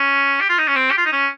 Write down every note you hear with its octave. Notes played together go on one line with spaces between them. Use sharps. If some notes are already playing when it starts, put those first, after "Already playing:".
Already playing: C#4
G4
F4
D#4
C#4
C4
G4
F4
D#4
C#4